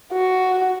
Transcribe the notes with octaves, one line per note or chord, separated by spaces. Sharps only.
F#4